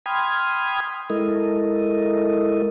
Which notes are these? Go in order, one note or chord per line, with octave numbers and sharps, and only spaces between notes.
G5 B5 C6 D#6 F6 G#6
G#3 E4 A4 A#4 D#5